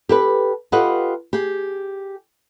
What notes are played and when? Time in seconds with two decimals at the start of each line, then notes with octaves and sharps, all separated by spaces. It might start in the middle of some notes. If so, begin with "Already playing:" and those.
0.09 G4 A4 B4
0.72 F4 G4 A4 B4 D#5 F#5
1.33 G4 G#4